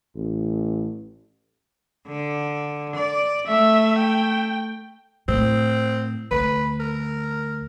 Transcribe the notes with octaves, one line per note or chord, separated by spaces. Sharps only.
A1
D3
D5
A3 E5
G5
A2 C4
D2 B4
A#4